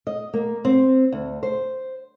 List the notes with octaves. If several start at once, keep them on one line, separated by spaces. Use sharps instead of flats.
D#5
A#3
C4
D2
C5